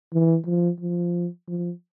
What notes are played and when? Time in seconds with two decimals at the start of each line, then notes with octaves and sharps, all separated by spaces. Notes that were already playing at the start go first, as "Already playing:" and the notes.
0.13 E3
0.46 F3
0.80 F3
1.47 F3